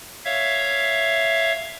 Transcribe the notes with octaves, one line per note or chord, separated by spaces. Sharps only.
C#5 E5 F5